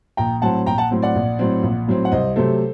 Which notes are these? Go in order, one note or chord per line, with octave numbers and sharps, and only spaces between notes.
A#1 G5 A#5
A2 F#3 C4 F#5 A5
A#1 G5 A#5
F#5 A5
A2 F#3 C4
D5 F#5
A#1
A2 F#3 C4
A#1
A2 F#3 C4
F#5
C2 C5 D#5
C3 F#3 A3 A4 C5